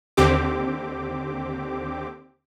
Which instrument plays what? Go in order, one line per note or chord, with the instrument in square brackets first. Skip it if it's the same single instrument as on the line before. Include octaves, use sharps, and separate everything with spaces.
[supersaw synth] D#2 D3 C4 G4 D6